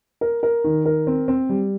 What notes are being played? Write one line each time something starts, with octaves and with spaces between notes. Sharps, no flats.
A#4
A#4
D#3
A#4
C4
C4
G3